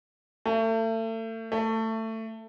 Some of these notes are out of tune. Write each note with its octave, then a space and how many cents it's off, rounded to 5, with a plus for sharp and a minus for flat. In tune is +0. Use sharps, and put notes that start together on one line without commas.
A3 +35
A3 +20